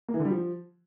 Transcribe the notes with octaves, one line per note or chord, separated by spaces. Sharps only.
A#3
E3
D3
G3
F3